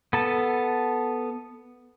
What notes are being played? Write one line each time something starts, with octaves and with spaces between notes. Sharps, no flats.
B3 A4 A5